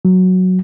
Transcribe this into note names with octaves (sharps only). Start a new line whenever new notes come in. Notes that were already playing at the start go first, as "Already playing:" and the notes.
F#3